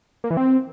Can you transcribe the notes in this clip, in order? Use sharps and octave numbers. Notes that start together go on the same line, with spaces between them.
A#3
E3
C4